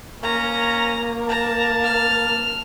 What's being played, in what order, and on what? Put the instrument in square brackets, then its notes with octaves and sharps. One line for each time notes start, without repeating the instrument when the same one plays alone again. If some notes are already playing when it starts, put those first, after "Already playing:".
[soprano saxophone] A#3 [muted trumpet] C#4 [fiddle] A#5
[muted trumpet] A5 [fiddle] A#5
[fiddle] F6